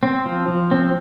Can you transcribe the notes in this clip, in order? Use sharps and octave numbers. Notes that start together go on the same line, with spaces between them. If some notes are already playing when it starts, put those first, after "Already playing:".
C4
F3
F3
C4